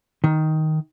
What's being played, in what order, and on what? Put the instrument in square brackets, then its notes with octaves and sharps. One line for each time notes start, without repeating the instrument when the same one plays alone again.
[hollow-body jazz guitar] D#3